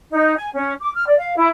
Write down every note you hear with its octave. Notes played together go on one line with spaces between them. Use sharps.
D#4
G#5
C#4
D6
F6
D5
F5
E4